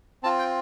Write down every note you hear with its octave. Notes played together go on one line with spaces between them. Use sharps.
C4 F4 A5
G5